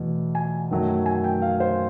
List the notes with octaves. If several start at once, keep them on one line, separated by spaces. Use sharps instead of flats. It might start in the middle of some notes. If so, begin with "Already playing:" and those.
Already playing: E2 B2 F#3 A3
G#5
F#2 D#3 F#3 A3
G#5
G5
F5
C5